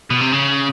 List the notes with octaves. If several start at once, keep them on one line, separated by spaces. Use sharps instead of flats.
B2
C3
C#3